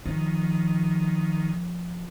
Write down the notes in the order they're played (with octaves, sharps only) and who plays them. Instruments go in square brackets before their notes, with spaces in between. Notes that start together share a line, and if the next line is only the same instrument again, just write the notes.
[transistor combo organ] D#3 [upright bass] F3